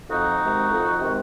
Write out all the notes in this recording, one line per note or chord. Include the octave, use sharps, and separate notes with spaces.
F2 D#4 F#4
C3 D#3 G#3
F2
C3 D#3 G#3